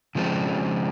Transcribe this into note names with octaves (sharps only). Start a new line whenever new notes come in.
C#3 F3 G#3 C4